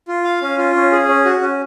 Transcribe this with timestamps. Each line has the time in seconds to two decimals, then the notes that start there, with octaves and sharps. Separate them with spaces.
0.08 F4
0.24 F5
0.42 C#4
0.58 F4
0.75 C#4
0.92 G#4
1.08 C#4
1.25 F#4
1.42 C#4